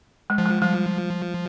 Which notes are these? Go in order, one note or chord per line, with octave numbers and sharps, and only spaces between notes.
G#3
F3
G#3
F3 G3